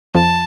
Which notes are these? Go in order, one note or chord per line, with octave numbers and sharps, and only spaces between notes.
F2 F3 A5